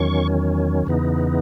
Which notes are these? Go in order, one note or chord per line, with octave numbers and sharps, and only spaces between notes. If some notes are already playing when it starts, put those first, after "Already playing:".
Already playing: E2 D#3 F#3 C#4 C#6
E2 C#3 E3 B3 D#4